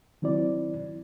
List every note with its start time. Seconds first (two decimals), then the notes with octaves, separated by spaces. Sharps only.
0.22 D#3 F#3 C4 E4 D5